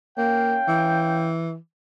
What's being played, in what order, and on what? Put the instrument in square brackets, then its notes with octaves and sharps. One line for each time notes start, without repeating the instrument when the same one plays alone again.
[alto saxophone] A#3 [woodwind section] C#4 F5 G5
[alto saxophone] E3